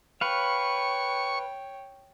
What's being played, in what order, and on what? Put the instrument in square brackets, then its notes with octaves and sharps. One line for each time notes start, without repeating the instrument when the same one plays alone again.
[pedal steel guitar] B4 F5 [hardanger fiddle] C#5 G5 [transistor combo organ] C#6